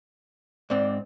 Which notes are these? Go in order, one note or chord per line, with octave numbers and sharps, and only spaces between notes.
G#2 C4 D5